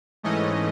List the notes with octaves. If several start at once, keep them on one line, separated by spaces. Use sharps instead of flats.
G#2 E3 A3 C#4 D#5